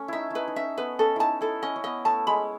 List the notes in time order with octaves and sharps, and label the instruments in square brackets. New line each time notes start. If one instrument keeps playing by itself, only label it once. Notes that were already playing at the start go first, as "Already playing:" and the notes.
Already playing: [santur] A3 C#4
[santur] D#4 E4 [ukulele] E5
[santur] D#4 E4 [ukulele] B4
[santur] D#4
[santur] C#4 [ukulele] E5
[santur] B3 [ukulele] B4
[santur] C#4 [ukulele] A4
[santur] D#4 E4 [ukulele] A5
[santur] E4 [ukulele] A4
[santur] C#4 [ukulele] D#5
[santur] C#4
[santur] B3 [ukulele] D#5
[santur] A3 [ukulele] A5
[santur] G#3 [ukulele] B5